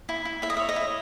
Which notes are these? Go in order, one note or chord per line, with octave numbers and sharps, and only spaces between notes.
E4
E4
E4 E5
D#5
E5
C#5
D#5
E4